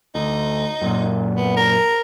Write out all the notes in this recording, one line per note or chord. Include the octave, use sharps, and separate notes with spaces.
D2 D#4
F#2 A#2
B3
A#4